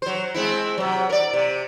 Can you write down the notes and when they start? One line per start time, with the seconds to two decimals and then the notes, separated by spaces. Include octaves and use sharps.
0.02 F#3 C5
0.34 G#3 C4 E4
0.78 C3 F#3
1.09 A#4 D5
1.33 C3